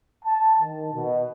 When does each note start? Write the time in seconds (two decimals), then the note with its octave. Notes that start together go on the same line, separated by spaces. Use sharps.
0.25 A5
0.60 D#3
0.94 B2